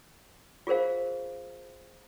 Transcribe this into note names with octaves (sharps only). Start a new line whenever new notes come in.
F4 G#4 A#4 C5 F5